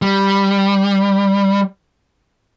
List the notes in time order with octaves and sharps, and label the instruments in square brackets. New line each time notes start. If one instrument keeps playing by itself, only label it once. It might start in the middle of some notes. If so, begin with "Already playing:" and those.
[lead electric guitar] G3